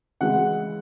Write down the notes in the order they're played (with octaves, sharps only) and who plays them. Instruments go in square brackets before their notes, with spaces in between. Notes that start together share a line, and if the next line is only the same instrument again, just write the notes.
[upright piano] C#3 E3 G#3 F#5